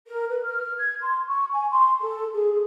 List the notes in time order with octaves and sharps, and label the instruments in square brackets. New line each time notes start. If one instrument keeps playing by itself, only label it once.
[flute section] A#4
B4
F6
G#6
C6
C#6
G#5
C6
A4
G#4
G#4